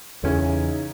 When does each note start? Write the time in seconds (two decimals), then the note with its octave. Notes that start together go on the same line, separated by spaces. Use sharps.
0.23 E2 C#3 E3 G#3 C#4 D#4 E4